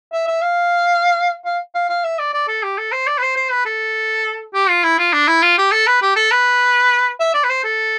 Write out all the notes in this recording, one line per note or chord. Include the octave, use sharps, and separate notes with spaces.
E5
E5
F5
F5
F5
F5
E5
D5
D5
A4
G4
A4
C5
D5
B4
C5
C5
B4
A4
G4
F4
E4
F4
D4
E4
F4
G4
A4
B4
G4
A4
B4
E5
D5
B4
C5
A4